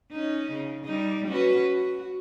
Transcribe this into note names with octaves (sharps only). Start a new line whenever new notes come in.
C#4 D#4
C#3
G3 D#4
C#4 F#4 B4
F#4